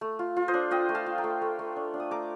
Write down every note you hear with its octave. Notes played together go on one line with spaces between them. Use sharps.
A3
F4
F4
C5 D#5
D4
F4 D#5 G5
A3
F5 A5
F4
G5 A#5
A3
A3
A3
D4
D4
D#6
A3 A#5 D6